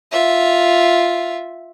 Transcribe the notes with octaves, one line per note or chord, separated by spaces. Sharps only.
F4 E5